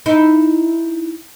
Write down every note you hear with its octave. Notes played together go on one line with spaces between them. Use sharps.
D#4 E4